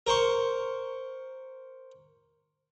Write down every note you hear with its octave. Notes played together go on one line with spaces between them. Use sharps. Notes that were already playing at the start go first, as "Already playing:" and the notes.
A#4 C5 C#6